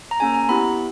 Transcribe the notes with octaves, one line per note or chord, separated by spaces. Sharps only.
A#5
A#3 C#4 G#4 G#5
A#5
B3 E4 G4 B5